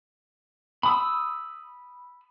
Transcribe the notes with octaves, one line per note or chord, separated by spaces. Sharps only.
B5 D#6 E6